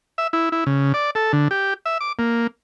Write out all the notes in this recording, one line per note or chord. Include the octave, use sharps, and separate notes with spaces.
E5
E4
E4
C#3
D5
A4
D3
G4
E5
D6
A#3